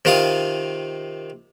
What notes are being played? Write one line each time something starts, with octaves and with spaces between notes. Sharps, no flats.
C3 D#3 F4 F5 D#6